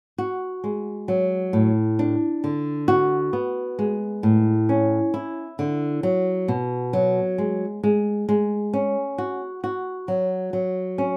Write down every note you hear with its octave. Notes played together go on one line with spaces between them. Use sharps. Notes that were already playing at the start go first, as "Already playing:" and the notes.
F#4
G#3
F#3
A2
D4
D3
F#4
B3
G#3
A2
C#4
E4
D3
F#3
B2
F#3
G#3
G#3
G#3
C#4
F#4
F#4
F#3
F#3
C#4